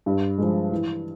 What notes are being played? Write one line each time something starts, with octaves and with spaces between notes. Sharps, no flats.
G2
F3 G#3
E3